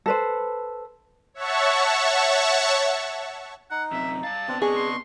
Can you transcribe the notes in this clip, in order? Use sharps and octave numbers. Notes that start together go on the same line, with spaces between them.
A4 B4 C5
C#5 E5 F#5 A5 C#6
D#4 F#5
F#2 C3 E5
G2 F5 A5
C3 B3 C4 D4
D4 G#4 D#5 C#6
C6